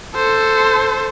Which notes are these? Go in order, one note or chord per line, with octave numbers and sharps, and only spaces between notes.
A4 C5